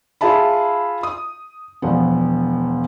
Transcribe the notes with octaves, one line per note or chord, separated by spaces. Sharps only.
F4 G#4 E5 A5 B5
D#6
E1 F3 B3